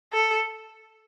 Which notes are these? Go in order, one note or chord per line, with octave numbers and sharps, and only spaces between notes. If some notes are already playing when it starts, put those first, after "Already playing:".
A4